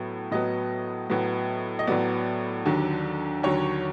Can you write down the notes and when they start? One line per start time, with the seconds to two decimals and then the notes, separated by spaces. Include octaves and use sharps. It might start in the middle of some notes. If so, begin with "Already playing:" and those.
Already playing: A2 F#3 B3
0.31 A2 F#3 B3 D#5
1.09 A2 F#3 B3
1.79 D#5
1.87 A2 F#3 B3 D5
2.66 D#2 D3 F#3
3.43 D#2 D3 F#3 C#5